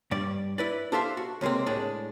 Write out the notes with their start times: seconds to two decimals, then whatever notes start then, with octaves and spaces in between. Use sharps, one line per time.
0.11 G2 G3 D5
0.58 E4 B4 D5
0.92 D4 G4 A4 C5 E5 F5
1.17 F#4
1.41 C#2 C3 G#3 A#3 C4
1.66 A2 G#3 D4